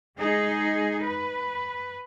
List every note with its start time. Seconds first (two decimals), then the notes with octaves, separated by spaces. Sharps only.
0.17 G#3 D#4 G#4
1.00 B4